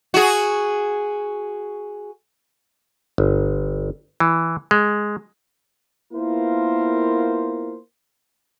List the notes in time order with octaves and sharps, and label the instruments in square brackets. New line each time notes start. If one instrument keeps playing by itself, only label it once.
[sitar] F#4 G#4
[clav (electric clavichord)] G1
E3
G#3
[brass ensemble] A#3 B3 E4 F4 A#4 C5